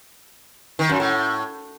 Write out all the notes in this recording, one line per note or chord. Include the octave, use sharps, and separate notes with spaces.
D#3
F#2
A2